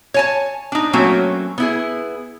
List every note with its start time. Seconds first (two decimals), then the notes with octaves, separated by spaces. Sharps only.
0.14 C#5 G#5 A5
0.72 D4 D#4
0.93 F#3 A3 A#3 C4 C#4 F#4
1.58 B3 E4 G#4